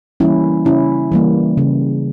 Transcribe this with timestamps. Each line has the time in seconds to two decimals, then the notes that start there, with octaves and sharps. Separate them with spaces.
0.20 E3 G3 A#3 C#4 E4
0.65 C#3 C#4 E4
1.12 E3 G3 A#3
1.57 C#3